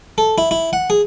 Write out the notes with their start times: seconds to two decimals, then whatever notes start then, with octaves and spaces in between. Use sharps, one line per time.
0.18 A4
0.38 E4
0.51 E4
0.73 F#5
0.90 G#4